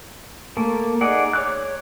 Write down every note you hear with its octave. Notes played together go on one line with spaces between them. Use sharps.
A3 A#3
D#4 G#4 D5 F#5
C#5 D6 F#6